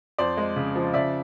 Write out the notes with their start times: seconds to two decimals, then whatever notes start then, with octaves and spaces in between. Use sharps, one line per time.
0.18 F2 C5 D5
0.37 G#3
0.56 C#3
0.75 F3
0.94 C#3 D5 E5